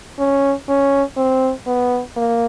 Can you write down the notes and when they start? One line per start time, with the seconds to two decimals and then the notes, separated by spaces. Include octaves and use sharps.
0.19 C#4
0.69 C#4
1.17 C4
1.67 B3
2.16 A#3